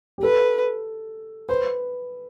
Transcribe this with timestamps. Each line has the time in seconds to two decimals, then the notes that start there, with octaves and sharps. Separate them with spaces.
0.18 G4
0.23 A4 B4
1.49 B4 C5